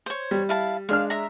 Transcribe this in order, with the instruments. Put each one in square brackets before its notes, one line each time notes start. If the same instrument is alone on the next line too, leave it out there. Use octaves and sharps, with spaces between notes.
[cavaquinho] C5 C#5
[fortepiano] G3
[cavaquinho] E4 F5 A5
[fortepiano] G#3 D4 F6 [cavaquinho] F5
[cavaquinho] E5 A#5